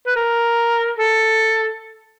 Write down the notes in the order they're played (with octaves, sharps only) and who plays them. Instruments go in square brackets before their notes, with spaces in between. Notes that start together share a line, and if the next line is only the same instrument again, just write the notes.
[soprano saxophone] B4
A#4
A4